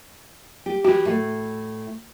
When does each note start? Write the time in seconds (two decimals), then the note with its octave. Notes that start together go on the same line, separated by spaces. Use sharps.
0.66 G4
0.85 E3 F#4 G4
1.05 A2 A3